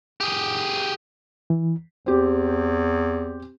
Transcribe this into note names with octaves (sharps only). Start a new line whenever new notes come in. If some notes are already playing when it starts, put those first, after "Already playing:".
G4 G#4
E3
E2 C4 G4